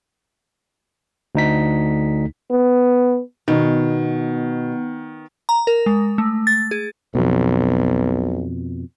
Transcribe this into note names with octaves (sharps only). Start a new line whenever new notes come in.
D2 D#4 B6
B3
B2 D#3
A#5
A#4
G#3
A3
A6
G#4
B1 F2 B2